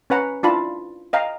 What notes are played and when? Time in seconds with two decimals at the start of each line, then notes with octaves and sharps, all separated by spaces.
0.10 C#4 B4 F#5 A#5
0.43 D4 E4 F4 A5 B5
1.13 D#5 F5 G5 A#5